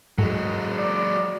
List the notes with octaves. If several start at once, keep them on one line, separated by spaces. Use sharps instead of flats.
A2 F#3 G#3
D5